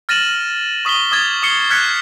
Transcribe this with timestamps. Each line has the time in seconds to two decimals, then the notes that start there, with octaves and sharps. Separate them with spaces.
0.09 F6 A6 A#6 D#7 E7 F#7
0.85 C#6 D#6 B6 D#7 G7
1.11 D6 D#6 G#6 A6
1.42 D6 D#6 C7 C#7 G7
1.70 F6 F#6 G#6 B6 C#7